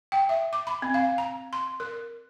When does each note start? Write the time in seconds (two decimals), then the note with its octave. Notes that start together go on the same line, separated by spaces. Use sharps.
0.12 G5
0.29 E5
0.53 D6
0.67 B5
0.82 C4
0.94 F5
1.18 A#5
1.53 C6
1.80 A#4